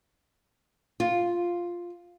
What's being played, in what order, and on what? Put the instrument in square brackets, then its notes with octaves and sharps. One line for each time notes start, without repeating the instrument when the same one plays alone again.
[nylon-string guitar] F4